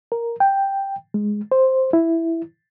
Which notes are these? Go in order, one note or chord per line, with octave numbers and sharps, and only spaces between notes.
A#4
G5
G#3
C5
E4